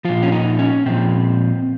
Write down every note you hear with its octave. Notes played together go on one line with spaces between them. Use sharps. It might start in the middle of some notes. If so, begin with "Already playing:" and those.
A#2 F3 F4
C#4
D#4
C#4
A#2 F3 C4